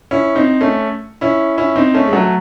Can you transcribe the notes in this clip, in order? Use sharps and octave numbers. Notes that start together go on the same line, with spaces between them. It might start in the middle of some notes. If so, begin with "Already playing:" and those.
C#4 E4
C4 D#4
A3 C#4
C#4 E4
C#4 E4
C4 D#4
A3 C#4
G#3
F#3 A3